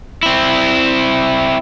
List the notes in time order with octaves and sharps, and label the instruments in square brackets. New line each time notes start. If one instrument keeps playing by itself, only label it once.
[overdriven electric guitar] C4 E4